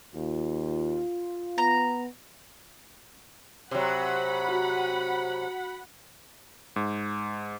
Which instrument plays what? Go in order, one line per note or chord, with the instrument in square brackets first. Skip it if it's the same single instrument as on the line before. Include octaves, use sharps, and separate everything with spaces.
[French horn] D#2 [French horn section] F4
[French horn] B3 [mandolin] A#5
[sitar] C3 F#3 [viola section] F#5 B5
[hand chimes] F#4
[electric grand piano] G#2